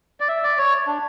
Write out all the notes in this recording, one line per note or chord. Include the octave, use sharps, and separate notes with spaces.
D5
E5
D5
C#5
D4